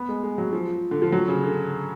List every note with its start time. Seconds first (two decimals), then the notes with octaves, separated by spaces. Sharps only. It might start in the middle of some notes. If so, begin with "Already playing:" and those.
Already playing: B3
0.09 G#3
0.23 G#3
0.38 F#3
0.53 F3
0.91 D3
1.02 F3
1.12 F#3
1.28 C#3
1.44 D3